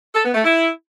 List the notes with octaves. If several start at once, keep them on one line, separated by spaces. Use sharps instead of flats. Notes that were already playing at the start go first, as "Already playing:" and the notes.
A4
B3
A3
E4